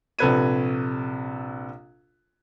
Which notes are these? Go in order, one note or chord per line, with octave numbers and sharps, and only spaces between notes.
A#1 C3 A4 B4 G#6 D#7